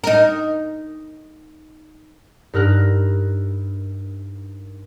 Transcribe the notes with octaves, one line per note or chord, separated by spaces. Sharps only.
D#4 A#4
G2 D#4 A#4 E6 F#6